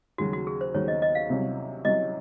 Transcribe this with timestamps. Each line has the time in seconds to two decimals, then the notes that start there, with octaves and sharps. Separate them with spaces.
0.18 D#2 C#3 F#3 F#4
0.33 F#4
0.47 G#4
0.61 C5
0.74 D#2 C#3 F#3 C#5
0.88 D#5
1.02 D#5
1.15 F5
1.29 C2 C3 F#3 C#4
1.84 C2 C3 F#3 C#4 D#5